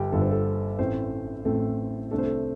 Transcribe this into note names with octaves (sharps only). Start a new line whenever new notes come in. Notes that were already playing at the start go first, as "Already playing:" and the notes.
Already playing: G1 G2 D3 G4
G1 G2 D3 A4
C5
A4
A1 A2 A3 C4 C5
A1 A2 A3 C4 A4
C2 C3 A3 D4 A4
C5
A4